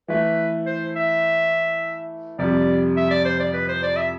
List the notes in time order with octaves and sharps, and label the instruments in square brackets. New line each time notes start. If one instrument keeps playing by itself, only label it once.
[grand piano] E3 A3 E4 [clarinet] B4
[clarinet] C5
E5
[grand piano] F2 C3 G3 [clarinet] D5
[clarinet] E5
D5
C5
D5
B4
C5
D5
E5